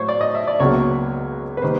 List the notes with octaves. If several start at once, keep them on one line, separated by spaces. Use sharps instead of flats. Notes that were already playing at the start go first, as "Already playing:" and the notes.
Already playing: A2 F#3 A3 C5 C#5
D5
D#5
E5
D5
C#2 B2 F#3 A#3 C#5
B4
D#3 G3 A#3 C5